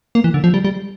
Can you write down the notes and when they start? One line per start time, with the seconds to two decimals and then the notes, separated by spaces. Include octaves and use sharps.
0.15 A#3
0.24 E3
0.34 D3
0.44 F3
0.54 G3
0.65 G3